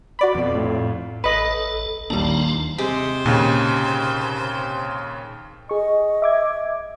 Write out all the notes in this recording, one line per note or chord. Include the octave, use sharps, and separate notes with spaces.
F#4 D5 B5
F2 B2
A2
A1 A4 B4 D#5 B5
D#2 A#2 G3 D4 A5 A#5 C6
C3 G#3 G4 C5
D#2 A#2 C#3
G#4 D#5 C#6
E5 D6 G#6